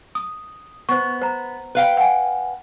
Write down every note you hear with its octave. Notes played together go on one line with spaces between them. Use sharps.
D#6
B3 C5 C#6
C5 A#5
B4 F5 G5
F#5 G#5